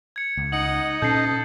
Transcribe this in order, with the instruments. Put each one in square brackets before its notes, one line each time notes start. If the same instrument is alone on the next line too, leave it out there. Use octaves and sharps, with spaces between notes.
[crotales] G#6 C#7
[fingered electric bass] C#2
[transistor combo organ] D#4 [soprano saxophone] F#5 [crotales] F#7
[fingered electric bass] A#2 C#4 [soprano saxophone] A4 [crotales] G6 C7